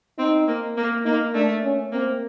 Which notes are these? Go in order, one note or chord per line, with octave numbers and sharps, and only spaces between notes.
C4 D#4
A#3
A#3
A#3 D#4
A3 D4
C#4
A#3 C4